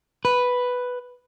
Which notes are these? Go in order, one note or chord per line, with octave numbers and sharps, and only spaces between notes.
B4